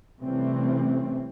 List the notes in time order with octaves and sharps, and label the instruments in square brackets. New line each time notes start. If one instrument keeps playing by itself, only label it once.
[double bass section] C3 E3 G3 A3 C4 C#4